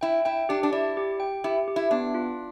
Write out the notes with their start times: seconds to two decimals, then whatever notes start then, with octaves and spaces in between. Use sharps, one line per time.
0.01 E4 G5
0.25 E4 G5
0.49 D4 G4
0.63 D4
0.72 E4 D5
0.97 G4
1.20 G5
1.44 E4 G4
1.68 G4
1.76 E4
1.91 B3 D4
2.14 F4